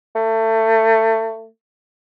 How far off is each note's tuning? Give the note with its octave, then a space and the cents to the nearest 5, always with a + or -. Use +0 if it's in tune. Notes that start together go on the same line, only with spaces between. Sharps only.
A3 +25